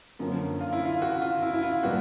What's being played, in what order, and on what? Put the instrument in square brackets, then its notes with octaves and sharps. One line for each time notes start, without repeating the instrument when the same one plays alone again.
[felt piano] F#2 D3 F3 A#3 C#4
[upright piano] F4
E4
F4
F#4
F4
E4
E4
F4
[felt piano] A#2 G3 B3 [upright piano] F#4